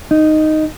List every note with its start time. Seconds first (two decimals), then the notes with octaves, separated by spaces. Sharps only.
0.11 D#4